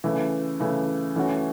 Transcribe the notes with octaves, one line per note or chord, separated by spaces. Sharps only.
C#3 E3 A3
C#3 E3 A3
E3 A3 C#4 F#4